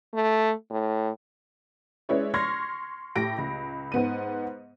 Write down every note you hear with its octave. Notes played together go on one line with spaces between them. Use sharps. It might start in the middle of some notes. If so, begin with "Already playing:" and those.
A3
A2
G#3 C#4 E4 B4 C#5 D5
C6 C#6 F6 G#6 A#6
A2 G4 A#6 D7
C#2
G#2 B3 D#7